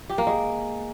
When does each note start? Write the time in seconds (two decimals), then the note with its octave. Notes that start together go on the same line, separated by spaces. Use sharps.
0.09 G4
0.18 A#3
0.27 G#3